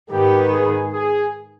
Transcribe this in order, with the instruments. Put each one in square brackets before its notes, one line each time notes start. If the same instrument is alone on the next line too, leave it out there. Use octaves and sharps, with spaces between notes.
[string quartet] G#2 D#3 B3 [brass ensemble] G4
[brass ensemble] G#4
G#4